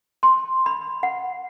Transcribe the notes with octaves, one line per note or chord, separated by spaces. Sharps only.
C6
B5
F#5